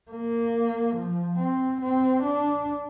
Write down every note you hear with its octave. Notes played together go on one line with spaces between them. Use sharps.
A#3
F3
C4
C4
D4